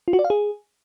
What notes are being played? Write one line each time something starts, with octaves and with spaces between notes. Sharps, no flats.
F4
F#4
D5
F5
G#4